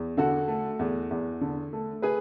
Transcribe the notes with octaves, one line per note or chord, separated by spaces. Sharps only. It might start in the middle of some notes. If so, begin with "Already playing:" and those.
Already playing: E2
D3 F#4 A4
A3
E2
E2
D3
A3
G#4 B4